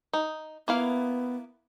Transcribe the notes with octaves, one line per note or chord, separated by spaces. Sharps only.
D#4
A#3 B3 E4 F5